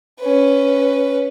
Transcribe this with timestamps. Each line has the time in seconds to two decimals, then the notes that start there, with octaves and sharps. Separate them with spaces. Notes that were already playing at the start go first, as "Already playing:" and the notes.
0.20 C#4 B4